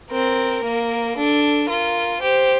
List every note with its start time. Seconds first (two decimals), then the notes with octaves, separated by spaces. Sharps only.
0.11 C4 A#4
0.64 A#3
1.17 D4 A4
1.69 F4 A#4
2.21 G4 C5